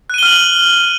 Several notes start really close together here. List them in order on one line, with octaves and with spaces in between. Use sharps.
F#6 D#7 G7 F6 F#7